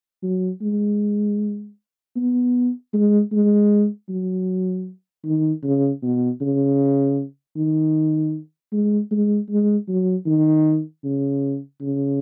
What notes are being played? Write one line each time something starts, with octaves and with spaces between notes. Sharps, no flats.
F#3
G#3
B3
G#3
G#3
F#3
D#3
C#3
B2
C#3
D#3
G#3
G#3
G#3
F#3
D#3
C#3
C#3